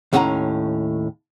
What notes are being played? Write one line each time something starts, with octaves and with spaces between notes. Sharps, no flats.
D#2 A2 C#4 F#5 A5 A#5